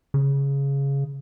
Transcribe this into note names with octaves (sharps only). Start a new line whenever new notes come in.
C#3